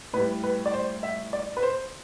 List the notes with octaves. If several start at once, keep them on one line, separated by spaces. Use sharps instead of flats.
A2 G3 B4
B4
D5
C5
E5
D5
B4
C5